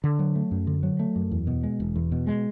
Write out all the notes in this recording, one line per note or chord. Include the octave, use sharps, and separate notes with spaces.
D3
F#3
A3
F#2
D3
F#3
A3
F#2
E2
B2
G#3
E1
E2
B2
G#3